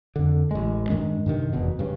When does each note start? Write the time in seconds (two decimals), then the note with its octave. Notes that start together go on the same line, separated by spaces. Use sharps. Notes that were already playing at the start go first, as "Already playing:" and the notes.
0.16 F2 D3
0.51 A1 G#3
0.89 G2 D#3 G#3 C#4
1.26 G2 C3 D#3
1.53 F1 E2 B2
1.79 G2 C#3